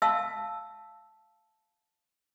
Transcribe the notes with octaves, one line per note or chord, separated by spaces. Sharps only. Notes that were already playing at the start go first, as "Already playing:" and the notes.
E5 F5 A5 E6